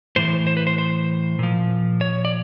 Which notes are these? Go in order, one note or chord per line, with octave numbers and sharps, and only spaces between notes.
A2 E3 C5
C5
B4
C5
C5
A#2 F3
C#5
D5